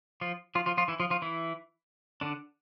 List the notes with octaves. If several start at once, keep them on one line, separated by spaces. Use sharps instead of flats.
F3 F4
F3 F4
F3 F4
F3 F4
E3 E4
F3 F4
F3 F4
E3 E4
D3 D4